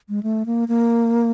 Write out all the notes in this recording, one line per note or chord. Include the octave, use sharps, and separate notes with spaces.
G#3
A3
A#3
A#3